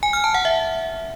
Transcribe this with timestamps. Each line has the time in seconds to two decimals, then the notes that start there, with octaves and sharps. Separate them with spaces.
0.03 G#5
0.13 F6
0.24 A5
0.34 F#5
0.45 E5